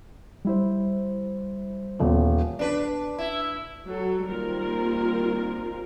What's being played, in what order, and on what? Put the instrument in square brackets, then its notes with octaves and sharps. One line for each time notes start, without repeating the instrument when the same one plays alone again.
[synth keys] G3 E4 C5
[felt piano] D#1 E2
[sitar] D4 B4
E4
[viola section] F#3 A4
D#3 G3 A#3 C4 F4 A#4